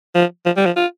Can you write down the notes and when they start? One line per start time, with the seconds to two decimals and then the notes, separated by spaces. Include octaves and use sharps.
0.15 F3
0.46 F3
0.57 G3
0.66 F3
0.77 F4